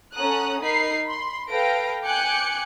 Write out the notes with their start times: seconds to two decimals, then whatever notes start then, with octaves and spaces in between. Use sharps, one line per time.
0.14 C#4 A4 F#5 A#5 D#6 F#6
0.61 D#4 A#4 B5 C7
1.04 B5 C6
1.49 A4 B4 F5 G5 A#6 D7
2.03 G5 G#5 D6 F#6 G6 C#7